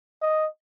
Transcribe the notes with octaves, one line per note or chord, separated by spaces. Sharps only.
D#5